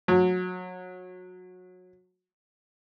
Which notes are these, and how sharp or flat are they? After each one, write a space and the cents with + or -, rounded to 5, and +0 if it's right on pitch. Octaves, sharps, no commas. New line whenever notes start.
F#3 -25